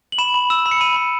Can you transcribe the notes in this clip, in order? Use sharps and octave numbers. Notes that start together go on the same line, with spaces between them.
F#7
B5 E7
B5
E6 E7
B5
C#7
B5 D#7
B5